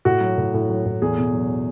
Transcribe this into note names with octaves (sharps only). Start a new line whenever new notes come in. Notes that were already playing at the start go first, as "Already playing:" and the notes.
A2 F#4
F#3
A2
A2
F#3
A2
E2 G#4
B2
F#3